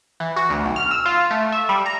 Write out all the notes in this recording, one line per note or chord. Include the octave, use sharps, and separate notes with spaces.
E3
F#4
D2
B1
F6
E6
F4
A3
E5
G3
A#5